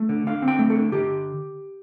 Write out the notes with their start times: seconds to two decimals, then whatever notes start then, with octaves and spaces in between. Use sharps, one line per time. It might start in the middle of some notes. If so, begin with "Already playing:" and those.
Already playing: A3
0.09 D3
0.27 D3 F5
0.42 C4
0.48 G5
0.59 A3
0.70 A4
0.76 D3
0.92 D3 G4